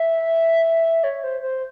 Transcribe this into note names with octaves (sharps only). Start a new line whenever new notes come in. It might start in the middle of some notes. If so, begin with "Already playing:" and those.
Already playing: E5
C#5
C5
C5